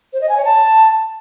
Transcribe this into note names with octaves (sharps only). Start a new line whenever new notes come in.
C5
D#5
G#5
C#5
A5